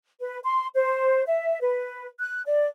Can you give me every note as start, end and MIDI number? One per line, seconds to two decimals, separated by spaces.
0.20 0.39 71
0.44 0.67 84
0.75 1.24 72
1.27 1.60 76
1.61 2.07 71
2.20 2.42 90
2.46 2.66 74